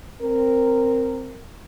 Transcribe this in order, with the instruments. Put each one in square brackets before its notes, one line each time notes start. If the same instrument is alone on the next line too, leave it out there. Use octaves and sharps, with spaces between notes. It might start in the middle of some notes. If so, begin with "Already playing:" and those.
[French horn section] C4 A#4